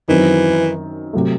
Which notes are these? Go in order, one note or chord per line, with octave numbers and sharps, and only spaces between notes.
F#2 D#3 E3 F#3 C4
C3 F#3 A3